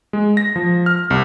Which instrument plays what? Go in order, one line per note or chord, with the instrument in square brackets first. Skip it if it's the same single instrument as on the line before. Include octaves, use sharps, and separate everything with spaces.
[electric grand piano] G#3
A#6
F3
F6
C2